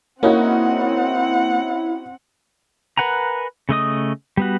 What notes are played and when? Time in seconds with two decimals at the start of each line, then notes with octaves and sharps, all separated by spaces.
0.23 A#3 C4 C#4 D#4 E4 F#4 F#5
2.98 A#4 B4 F#5 G#5 A#5
3.69 C#3 A3 D#5 D#6
4.37 G3 B3 F#4